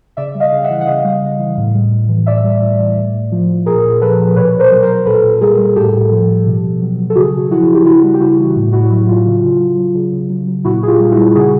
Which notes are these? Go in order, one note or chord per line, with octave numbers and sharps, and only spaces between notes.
C#3 D5 E5
G3
D#5 F5
C#3
E5 F#5
E3
F#5
C#3 D#5 F5
G3
C#3
E3
A2
G3
A2
E3
A2 D5 E5
G3
A2
E3
A2
A2
F3
F3
A#2 G#4 A#4
A#2
F3 A4 B4
F3
B2 B4 C#5
B2
A#4 C5
F#3
A#4 C5
F#3
A#2 A4 B4
A#2
G3 G#4 A#4
G3
A2 G4 A4
A2
F3
F3
B2
B2
F#3
F#3
A4
C#3 F#4 G#4
C#3
F3 E4 F#4
F3
G4
C#3 E4 F#4
G3
G4
C#3 E4 F#4
E3
A2
A2 E4 F#4
F#3 E4
F#3 F4
C#3
C#3
F#3
F#3
C#3
C#3
F#3
F#3
A#2 E4 F#4
A#2 G#4
F4 G4
G3
E4 F#4
G3
C#3 F#4 G#4